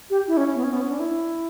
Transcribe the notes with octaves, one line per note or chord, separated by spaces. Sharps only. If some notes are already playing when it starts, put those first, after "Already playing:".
G4
E4
C#4
B3
C#4
B3
C#4
D4
E4